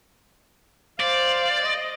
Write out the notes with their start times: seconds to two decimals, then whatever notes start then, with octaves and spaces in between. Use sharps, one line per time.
1.00 C5 D5 F5
1.62 D#5